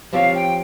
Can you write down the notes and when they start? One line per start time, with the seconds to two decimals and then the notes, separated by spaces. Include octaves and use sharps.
0.13 F3 C4 G4 C#5 F5
0.33 G5